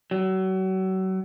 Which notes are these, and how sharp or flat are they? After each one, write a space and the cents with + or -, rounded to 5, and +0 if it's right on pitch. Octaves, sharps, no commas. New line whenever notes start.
F#3 +35